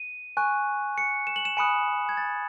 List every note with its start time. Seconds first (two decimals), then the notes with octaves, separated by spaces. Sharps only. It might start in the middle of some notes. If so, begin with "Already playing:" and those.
Already playing: D#7
0.37 G#5 C#6 F#6
0.98 C#7
1.27 E7
1.36 F#7
1.45 E7
1.57 G#5 B5 D#6 F#6 C#7
2.09 G#6
2.17 A6